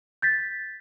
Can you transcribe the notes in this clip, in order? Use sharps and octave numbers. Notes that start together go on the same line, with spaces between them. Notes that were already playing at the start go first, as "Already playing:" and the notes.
G6 A6 B6